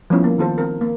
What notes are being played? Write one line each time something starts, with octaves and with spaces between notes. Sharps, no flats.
F3 G3 A3 B3 C#4 E4
A#3
D#3 F4 A4 C5
C4 A#4
A#3